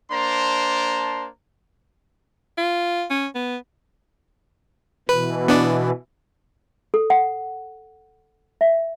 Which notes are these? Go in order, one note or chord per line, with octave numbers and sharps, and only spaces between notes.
A#3 D4 C5 A5 A#5 C6
F4
C#4
B3
B2 E3 B4
B3 D4 D5
A4
F#5
E5